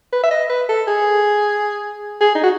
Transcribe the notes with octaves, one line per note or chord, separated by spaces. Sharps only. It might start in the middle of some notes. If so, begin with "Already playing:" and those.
B4
E5
D#5
B4
A4
G#4
G#4
D#4
F#4